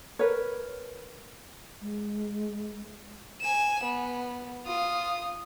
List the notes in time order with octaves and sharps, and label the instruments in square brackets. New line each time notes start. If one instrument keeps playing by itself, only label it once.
[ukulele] A#4 B4 C#5
[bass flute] G#3
[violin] G#5 E7
B3
F4 D#6